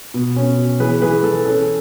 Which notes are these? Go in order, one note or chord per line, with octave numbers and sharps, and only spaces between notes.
B2
C#4
B2
E3 G#4 B4
E3 G#4 B4
E3 A4
C#4 A4